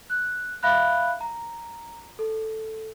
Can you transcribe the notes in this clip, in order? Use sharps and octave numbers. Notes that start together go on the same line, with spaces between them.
F#6
E5 F5 B5 F#6
A#5
A4